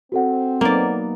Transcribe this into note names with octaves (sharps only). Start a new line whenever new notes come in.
C4 F#4 A4 F#5
F#3 A#3 B3 D#4 D5